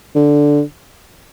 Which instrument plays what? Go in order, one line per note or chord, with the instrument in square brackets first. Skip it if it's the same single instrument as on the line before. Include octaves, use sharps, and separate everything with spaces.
[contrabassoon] D3